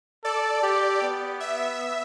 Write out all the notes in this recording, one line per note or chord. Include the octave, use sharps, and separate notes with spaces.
A4 D5
G4
B3
E5